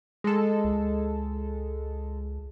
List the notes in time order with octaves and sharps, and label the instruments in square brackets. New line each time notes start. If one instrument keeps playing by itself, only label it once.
[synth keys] G#3 A4
[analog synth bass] C#2